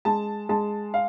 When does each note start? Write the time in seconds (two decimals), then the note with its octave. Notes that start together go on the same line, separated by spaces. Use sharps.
0.05 G#3 A5
0.49 G#3 A5
0.94 F5